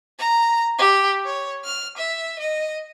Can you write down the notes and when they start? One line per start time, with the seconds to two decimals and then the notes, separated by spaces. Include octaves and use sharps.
0.19 A#5
0.78 G4
1.25 C#5
1.64 F6
1.97 E5
2.39 D#5